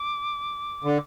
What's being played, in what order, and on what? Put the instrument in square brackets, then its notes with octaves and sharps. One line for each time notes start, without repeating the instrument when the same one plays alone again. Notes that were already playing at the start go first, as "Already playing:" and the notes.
Already playing: [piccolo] D6
[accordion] D3